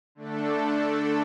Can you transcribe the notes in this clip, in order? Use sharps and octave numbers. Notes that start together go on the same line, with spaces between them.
D3 A3 D4 A4